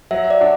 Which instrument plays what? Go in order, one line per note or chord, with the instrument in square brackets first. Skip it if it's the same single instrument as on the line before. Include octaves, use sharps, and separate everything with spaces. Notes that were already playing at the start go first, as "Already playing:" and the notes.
[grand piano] F#3 [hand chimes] E5
[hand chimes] D5
[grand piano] D4 F#4